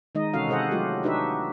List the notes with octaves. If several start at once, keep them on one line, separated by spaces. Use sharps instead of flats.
D#3 G#3 D#4 D#5
C3 E3 C#4 F#4 A4 F5
C3 G#4 A4 C5 D#5 F#5
F#3 A3 F4 G4
D4 D#4 F#4 G4 B4 E5